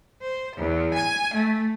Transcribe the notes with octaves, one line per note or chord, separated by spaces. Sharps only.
C5
E2
G#5
A3